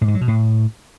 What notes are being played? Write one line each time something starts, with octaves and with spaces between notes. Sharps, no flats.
A2
G#2
F#3
B2
A2